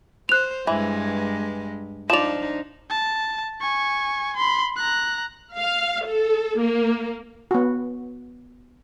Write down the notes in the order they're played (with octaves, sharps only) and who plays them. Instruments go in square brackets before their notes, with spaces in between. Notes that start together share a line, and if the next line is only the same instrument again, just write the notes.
[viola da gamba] C5 [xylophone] F#6 F7
[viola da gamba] G2 G#3 [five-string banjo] E3
[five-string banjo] F3 D5 [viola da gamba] D4 D#4 [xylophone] E7 F7
[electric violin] A5
G#5 C#6
B5 C6
A#5 F#6
[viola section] F5
A4
A#3
[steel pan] B3 F#4